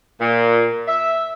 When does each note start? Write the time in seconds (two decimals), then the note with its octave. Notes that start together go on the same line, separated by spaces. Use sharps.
0.20 A#2
0.87 E5